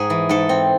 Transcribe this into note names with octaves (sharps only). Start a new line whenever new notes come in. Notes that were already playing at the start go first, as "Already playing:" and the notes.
Already playing: G#2 G#4
E3
G#2 A4
C4